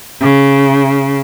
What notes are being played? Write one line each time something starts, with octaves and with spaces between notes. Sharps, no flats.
C#3